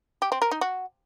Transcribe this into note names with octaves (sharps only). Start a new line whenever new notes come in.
G4
C4
A#4
D#4
F#4